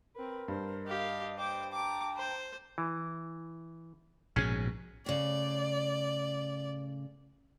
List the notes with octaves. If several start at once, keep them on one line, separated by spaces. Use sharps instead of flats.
C4 A#4 B4
G2 C5
G4 D#5 F5
C5 G5 D6
G5 A5 A#5 D6
C5
E3
A#1 G#2 B2 C#4 G#4
A2 C#3 D5